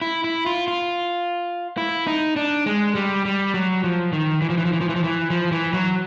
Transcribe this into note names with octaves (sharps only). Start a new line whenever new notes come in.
E4
E4
F4
F4
E4
D#4
D4
G#3
G3
G3
F#3
F3
D#3
E3
F3
E3
F3
E3
F3
E3
F3
E3
F3
E3
F#3